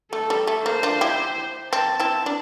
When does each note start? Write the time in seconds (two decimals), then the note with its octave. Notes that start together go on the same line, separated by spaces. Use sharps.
0.13 A3 A4
0.30 G3
0.47 A3
0.66 A#3 C5
0.83 D4 F4
1.01 E4 G4
1.73 C4 A5
2.00 C4 E4
2.26 D4